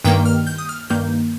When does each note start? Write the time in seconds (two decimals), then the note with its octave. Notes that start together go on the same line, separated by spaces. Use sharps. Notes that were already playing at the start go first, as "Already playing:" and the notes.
0.04 G2 D#3 A#3 G5
0.26 F6
0.47 G6
0.58 D#6
0.69 F6
0.90 G2 D#3 A#3 G6